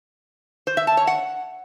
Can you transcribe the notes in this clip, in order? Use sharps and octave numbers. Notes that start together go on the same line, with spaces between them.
C5
E5
A5
C#5
F#5